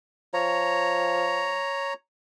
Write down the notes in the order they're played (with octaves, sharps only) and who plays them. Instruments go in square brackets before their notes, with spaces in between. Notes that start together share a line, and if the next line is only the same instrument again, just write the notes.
[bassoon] F3 [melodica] C#5 A#5